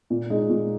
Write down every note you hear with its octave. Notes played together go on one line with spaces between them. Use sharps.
A#2
G#3 D#4
A#2